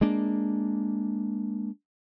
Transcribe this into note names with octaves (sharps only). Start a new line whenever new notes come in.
G#3 A#3 D4